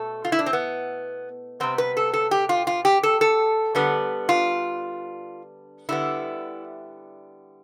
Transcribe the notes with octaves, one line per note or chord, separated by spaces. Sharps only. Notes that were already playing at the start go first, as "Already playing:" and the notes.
Already playing: B2 A3 A4
F4
E4
D4
C4
B3
C3 G3 B3 C4
B4
A4
A4
G4
F4
F4
G4
A4
A4
D3 G3 B3
F4
D3 G3 B3 E4